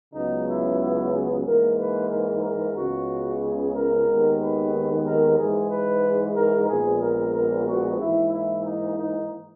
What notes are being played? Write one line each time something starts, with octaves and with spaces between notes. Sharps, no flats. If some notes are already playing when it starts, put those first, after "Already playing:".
C#2 C#3 F#3 B3 D#4
E4
E4
G#4
G#2 E3 A#3 A#4
B4
A#4
A#4
C#2 C#3 G#3 B3 F#4
G#4
A#4
D#2 D#3 G#3 B3
B4
A#4
G#2 E3 G#3 G#4
B4
A#4
A#1 A#2 G#3 B3 G#4
A#4
A#4
F#4
G#2 E3 A#3 E4
E4
D#4
D#4